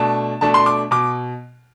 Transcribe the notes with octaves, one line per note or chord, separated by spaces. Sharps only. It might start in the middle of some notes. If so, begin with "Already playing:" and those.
Already playing: B2 A3 D4 A5
B2 A3 D4 A5
C6
D6
B2 D6